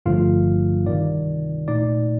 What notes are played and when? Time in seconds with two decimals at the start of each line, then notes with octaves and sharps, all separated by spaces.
0.06 G1 G2 D3 F3 A3 F4 F5
0.86 C2 C3 D#3 D5
1.68 A#2 A3 D#4 D5